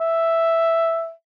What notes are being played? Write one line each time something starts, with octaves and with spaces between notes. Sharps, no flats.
E5